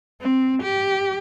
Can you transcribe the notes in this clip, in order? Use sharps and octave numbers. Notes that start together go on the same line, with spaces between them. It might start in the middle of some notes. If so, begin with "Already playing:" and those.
C4
G4